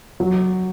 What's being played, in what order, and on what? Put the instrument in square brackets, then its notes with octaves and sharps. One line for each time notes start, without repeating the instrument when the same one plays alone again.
[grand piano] F#3